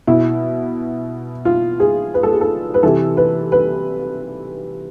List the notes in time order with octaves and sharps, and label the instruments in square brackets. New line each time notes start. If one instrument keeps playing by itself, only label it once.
[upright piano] B2 E4
F4
G#4
B4
A4
G#4
A4
B4
C3 E3 A4
B4
B4